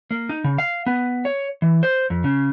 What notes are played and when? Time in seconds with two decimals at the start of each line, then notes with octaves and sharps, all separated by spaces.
0.11 A#3
0.29 D#4
0.44 C#3
0.58 F5
0.86 B3
1.25 C#5
1.62 E3
1.83 C5
2.10 F2
2.24 C#3